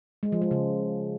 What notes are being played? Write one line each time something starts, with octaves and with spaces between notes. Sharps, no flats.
G#3
F3
G#3
C#3